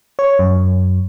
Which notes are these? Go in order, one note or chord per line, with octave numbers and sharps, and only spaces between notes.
C#5
F#2